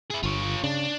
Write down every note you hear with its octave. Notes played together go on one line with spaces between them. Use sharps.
E4 G#4
G1 F4 C#5
C#3 D4